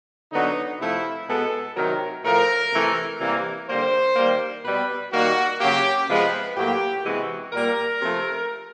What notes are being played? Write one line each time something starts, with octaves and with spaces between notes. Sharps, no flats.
D3 F#3 B3 D#4
C3 F3 A3 E4
B2 G#3 B3 A4
C3 D#3 F#3 A#4
A2 F3 A3 A#4
C3 E3 A3
C3 E3 G3 A#3
D3 G3 A#3 C5
D#3 G3 A#3
B2 G3 B3 B4
D#3 G3 A#3 F#4
C#3 F#3 A#3 G4
C3 F3 G#3 B3 B4
A2 F#3 A#3 G4
C3 E3 G#3 B3 F#4
A#2 G3 A#3 A#4
C3 F3 A3